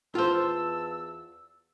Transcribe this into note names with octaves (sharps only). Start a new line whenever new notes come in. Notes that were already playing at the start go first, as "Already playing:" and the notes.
E2 F4 C5 A5 E6